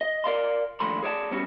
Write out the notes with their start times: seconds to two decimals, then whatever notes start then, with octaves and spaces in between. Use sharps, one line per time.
0.01 D#5
0.24 A#4 D5 F5 C6
0.80 D#2 D3 F3 A3 B5 C6
1.03 G#4 C#5 D5 F5 A5
1.31 B2 G3 B3 C#4 F#4